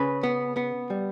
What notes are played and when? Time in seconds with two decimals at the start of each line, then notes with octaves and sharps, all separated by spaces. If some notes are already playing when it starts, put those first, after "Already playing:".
Already playing: C#3 B4
0.23 B3
0.57 B3
0.90 G3